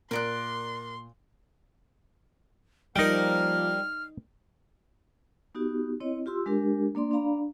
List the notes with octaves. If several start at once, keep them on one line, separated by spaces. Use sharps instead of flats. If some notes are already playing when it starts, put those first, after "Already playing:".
A#2 A#4 D5 C6 F#6
F3 G3 A#3 D#4 A#4 G5 F6
B3 D#4 F#4 G4
C4 E4 C#5 D#5
F4 G4 C6 E6
G#3 D4 G4 A#4
A#3 D4 D5 C6
D4 D5 F5 A#5 B5